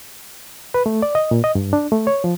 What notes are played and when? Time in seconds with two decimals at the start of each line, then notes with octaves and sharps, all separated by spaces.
0.74 B4
0.86 A3
1.02 D5
1.15 D#5
1.31 A#2
1.44 D#5
1.55 G2
1.73 D4
1.92 A3
2.07 C#5
2.24 F3